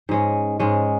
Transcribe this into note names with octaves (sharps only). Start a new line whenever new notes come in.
G#2 G#3 C#4
G#2 G#3 C#4